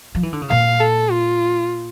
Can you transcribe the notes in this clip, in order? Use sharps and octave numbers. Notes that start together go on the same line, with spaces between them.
F3
E3
D3
C#3
A#2 F5
A4
F4